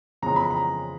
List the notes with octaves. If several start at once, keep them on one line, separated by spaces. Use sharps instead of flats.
F2 C#3 E3 G#3 B3 A#5
B5
A#5